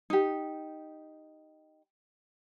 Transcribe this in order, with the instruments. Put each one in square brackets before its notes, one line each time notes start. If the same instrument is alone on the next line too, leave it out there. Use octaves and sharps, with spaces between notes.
[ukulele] D#4 G4